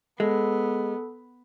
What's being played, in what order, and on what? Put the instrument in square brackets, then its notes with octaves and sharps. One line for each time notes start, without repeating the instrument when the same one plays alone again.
[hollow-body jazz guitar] G#3 [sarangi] B3 [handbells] A4